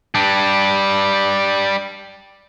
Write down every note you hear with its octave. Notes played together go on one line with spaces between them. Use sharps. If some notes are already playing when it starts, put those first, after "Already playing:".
G3 D4